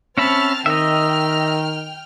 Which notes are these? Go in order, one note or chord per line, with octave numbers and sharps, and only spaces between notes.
C4 C#4 E5 A5 B5 F6
D#3 D#5 E5 G5 F6